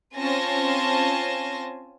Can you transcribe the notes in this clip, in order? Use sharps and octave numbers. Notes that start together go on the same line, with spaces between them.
C4 C#4 F4 G#5 A5 A#6